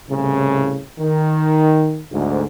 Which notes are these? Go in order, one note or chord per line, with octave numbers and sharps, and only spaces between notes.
C2 A2 C#3
D#3
D2 G#2